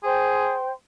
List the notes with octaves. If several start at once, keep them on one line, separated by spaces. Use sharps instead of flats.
G#4 C5 G5 C6